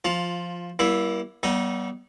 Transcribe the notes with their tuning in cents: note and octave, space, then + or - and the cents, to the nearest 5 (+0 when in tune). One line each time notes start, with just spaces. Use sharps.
F3 +0 F4 +15
G3 -25 A#3 +35 E4 +0
G3 -45 B3 -30 D#4 +0